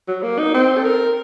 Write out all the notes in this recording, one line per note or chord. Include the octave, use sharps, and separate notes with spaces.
F#3
A#3
D#4
C4
A4
A#4